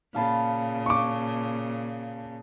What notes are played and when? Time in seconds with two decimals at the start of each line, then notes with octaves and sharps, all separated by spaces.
0.15 A#2 C#3 F5 A5 B5
0.86 C#6 D6